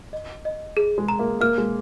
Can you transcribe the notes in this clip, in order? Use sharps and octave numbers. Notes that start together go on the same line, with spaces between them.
D#5
D#5
G#4
G#3
A#5
A#3
A#3 F6
G#3